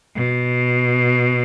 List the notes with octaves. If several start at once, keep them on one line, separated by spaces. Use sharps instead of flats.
B2